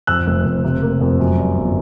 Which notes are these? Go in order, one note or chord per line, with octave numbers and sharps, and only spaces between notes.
F2 E6 F#6
F1
F1
C3
A#3
F2
F#2
G3
G1